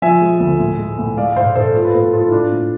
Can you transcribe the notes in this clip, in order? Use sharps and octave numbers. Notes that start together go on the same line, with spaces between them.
F3 E5 G#5
G#3
D2
A2
G#3
A2
G#3 D5 F5
F5
G#2 C5 E5
G#2 A4 C5
A3 F4 A4
B4
A2 A4 C5
A2 F4 A4
E4
G#3 D4 F4
A2